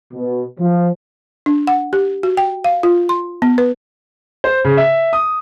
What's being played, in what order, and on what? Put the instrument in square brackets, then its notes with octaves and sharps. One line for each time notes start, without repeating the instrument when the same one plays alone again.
[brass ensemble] B2
F3
[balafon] D4
F#5
G4
F#4
G5
F5
F4
C6
B3
B4
[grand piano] C5
C#3
E5
D#6